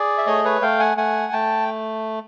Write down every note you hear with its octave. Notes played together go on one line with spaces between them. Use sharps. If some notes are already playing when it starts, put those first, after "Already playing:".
Already playing: G#4 D5
E5
A3 C#5 D#5
B4 C#5
A3 F5 G5
F#5 G#5
A3 F#5 G#5
A3 G5 A5